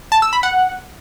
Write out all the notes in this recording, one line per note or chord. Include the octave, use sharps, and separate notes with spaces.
A5
E6
B5
F#5